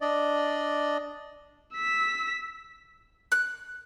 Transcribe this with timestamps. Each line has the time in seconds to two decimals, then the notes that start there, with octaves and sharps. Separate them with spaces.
0.01 D4 D5 D#5
1.74 E6 B6
3.32 F#6